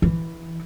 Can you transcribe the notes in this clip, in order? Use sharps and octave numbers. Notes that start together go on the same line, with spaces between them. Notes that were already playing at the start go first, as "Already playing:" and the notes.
E3